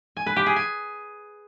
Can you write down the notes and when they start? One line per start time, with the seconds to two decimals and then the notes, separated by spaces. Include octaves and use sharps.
0.17 G#5
0.26 B4
0.36 G4
0.46 G#4
0.56 G#5